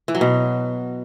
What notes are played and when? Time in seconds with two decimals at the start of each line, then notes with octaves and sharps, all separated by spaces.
0.08 E3
0.15 F#3
0.21 B2